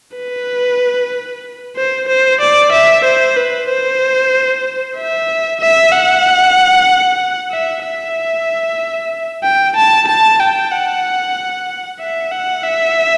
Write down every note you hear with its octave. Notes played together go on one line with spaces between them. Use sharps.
B4
C5
C5
D5
E5
C5
B4
C5
E5
E5
F#5
E5
E5
G5
A5
A5
G5
F#5
E5
F#5
E5